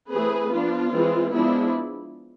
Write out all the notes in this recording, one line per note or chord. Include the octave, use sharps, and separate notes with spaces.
E3 A3 C4 G#4 B4
F3 B3 D4 F4
E3 G#3 C4
F3 G#3 B3 D4 E4